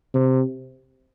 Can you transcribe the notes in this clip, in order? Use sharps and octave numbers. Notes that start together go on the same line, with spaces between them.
C3